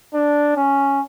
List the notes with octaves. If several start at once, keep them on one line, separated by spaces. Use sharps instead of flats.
D4
C#4